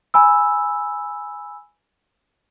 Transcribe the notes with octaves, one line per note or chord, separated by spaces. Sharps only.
G#5 B5 E6